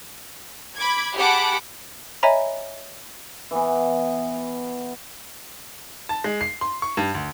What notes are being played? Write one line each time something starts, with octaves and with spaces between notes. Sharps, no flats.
B5 D6 G#6
G4 G#4 F#5 A5 B5 D6
C#5 D#5 E5 G#5 A#5 B5
E3 B3
A5
G#3
C7
C6
C#6
G2
D2